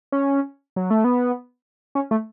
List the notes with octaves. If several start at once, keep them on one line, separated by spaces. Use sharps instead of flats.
C#4
F#3
A3
B3
C#4
A3